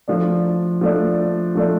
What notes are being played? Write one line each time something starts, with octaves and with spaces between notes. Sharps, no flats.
F3 A3 D4
F3 A3 D4
F3 A3 D4